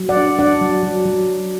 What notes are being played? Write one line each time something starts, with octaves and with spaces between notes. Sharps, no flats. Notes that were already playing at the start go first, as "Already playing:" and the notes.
Already playing: F#3
D5 F#5
D4
D4 D5 F#5
F#3
F#3
F#3